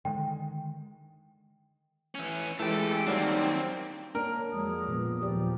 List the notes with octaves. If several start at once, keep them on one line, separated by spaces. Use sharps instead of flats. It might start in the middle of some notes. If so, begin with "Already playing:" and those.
D3 D#3 G#3 G5
E3 C#4
E3 G#3 A3 G4 A4
D#3 F#3 G3 A#3 C4 D4 D#4 C#5
A#3 D4 A#4 C#5
F2 F#3 G#3 D#6
A#2 F3 B3
D#2 A#2 F3 G4 D5